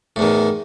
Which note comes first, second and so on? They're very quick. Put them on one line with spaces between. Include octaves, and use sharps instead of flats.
A2 E2 D#3